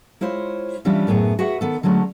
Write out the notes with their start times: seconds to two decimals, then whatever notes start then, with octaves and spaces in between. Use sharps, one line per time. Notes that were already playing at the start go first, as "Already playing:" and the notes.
0.21 G#3 E4 F4 C5 C#5
0.85 E3 G3 C#4 D4 E4 F4
1.07 F#2 A2 B3 G#4
1.39 F#4 G#4 B4 E5 F#5
1.61 D#3 B3 A4
1.83 D3 F#3 G#3 A3 C#4